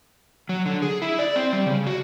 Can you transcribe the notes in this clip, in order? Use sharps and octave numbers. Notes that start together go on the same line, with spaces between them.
F#3
D3
G#4
E4
D5
C4
G3
C#3
F#4